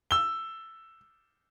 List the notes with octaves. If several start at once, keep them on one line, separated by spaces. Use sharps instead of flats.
E6 G7